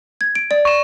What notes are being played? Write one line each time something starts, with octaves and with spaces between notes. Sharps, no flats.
G#6
D7
D5
C#6 E7